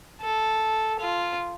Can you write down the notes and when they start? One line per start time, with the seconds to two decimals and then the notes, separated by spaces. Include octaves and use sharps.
0.21 A4
1.00 F4